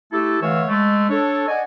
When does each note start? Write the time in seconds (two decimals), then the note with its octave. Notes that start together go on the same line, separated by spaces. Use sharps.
0.11 A3 E4 G4 A4
0.42 D3 E3 A3 C#5 F5 E6
0.68 G#3 A3
1.10 D4 A4 C#5
1.48 D5 D#5 F#5 G#5